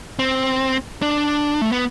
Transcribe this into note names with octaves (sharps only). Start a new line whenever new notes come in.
C4
D4
A3
B3